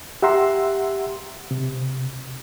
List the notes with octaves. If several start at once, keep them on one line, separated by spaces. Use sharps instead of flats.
G4 E5 F#5 A#5 C6 E6
C3